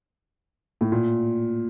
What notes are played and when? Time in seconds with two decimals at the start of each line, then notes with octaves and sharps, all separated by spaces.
0.81 A2
0.92 A#2